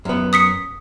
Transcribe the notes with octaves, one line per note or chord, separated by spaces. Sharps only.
F#2 B3
D#6 B6 C#7